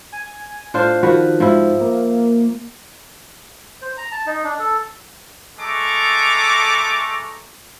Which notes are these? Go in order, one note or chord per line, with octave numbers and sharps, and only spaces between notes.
G#5
A2 D4 F4 C5
D#3 F3 F#4 B4
G#2 F3 E4
A#3
C5
A#5
A5
D#4
D4
A4
G#3 A3 A4 A#5 C#6 D6